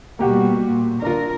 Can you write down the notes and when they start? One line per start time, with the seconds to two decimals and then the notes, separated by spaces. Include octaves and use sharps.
0.19 B2 G3 A#3 F#4 G4 F#5
0.65 A#2
1.02 D3 D4 F4 A#4